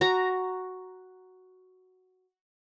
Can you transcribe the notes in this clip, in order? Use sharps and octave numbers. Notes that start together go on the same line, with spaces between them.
F#4 A#5